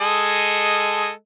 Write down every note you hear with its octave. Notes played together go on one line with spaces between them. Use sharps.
G#3 A4 D#5